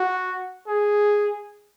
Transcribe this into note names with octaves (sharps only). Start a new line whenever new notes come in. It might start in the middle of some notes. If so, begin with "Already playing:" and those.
Already playing: F#4
G#4